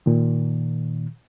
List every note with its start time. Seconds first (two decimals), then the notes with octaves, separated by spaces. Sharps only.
0.06 A#2 D#3